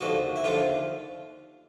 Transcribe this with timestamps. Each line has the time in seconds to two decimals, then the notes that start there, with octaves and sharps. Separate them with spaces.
0.01 D#2 D3 F3 F#4
0.36 E4
0.44 D#2 D3 F3 F4